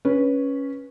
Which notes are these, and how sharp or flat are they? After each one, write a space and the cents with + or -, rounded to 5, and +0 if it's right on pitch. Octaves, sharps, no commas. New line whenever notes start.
C#4 +0 B4 -15